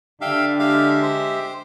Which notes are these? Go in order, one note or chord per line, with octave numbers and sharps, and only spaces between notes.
D3 D4 G4 E5 F5
G#3 G4 E5 F5
C5